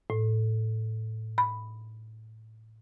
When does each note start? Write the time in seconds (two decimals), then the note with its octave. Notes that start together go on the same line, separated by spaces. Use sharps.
0.10 A2
1.38 B5